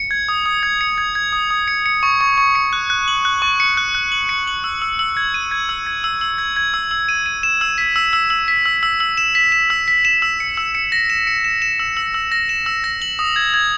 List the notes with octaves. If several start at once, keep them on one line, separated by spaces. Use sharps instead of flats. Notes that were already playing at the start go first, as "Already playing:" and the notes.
Already playing: C#7
G#6
D#6
D#6
G#6
C#7
G#6
G#6
D#6
D#6
C#7
C#7
C#6
C#6
C#6
C#7
F#6
F#6
F#7
F#6
C#6
C#7
F#6
F#6
F#7
C#7
F#7
E6
E6
E6
G#6
D#7
G#6
E6
G#6
E6
E6
G#6
G#6
E6
E6
D#7
D#7
E7
E6
B6
E6
E6
E6
B6
E6
E6
E6
E7
B6
E7
E6
B6
E7
E6
C#7
E6
C#7
A#6
E7
C#7
E7
E7
E6
E6
E6
A#6
E7
E6
A#6
F#7
D#6
G#6
G#6